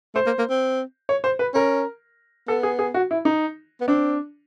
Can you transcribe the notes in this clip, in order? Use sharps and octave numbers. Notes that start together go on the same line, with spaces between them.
A3 C5
A#3
A#3
C4
C#5
C5
B4
C#4 A#4
B3 A4
G#4
G#4
F#4
E4
D#4
B3
C4 D4